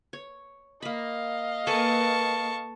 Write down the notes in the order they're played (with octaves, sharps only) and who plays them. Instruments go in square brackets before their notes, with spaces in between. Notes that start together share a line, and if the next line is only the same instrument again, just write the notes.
[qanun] C#5
[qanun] A#3 B5 [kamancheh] D#5 F5
[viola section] A#3 [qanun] A4 B4 G#5 [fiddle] A5 C#6